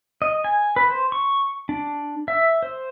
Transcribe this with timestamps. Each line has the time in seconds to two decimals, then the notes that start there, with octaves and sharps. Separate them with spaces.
0.22 D#5
0.44 G#5
0.76 B4
0.90 C5
1.12 C#6
1.69 D4
2.28 E5
2.63 C5